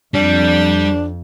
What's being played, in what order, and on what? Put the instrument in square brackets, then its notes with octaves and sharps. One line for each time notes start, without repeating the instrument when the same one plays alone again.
[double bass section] F2 [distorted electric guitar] G3 [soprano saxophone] D4